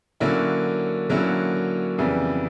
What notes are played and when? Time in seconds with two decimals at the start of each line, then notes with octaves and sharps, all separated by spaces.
0.20 D3 F#3 A#3 C#4 E4
1.09 D3 F#3 A#3 C#4 E4
1.98 F2 C#3 E3 G3 B3